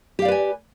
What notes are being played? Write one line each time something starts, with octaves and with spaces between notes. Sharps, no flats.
G4 B4 D5 F5 G#5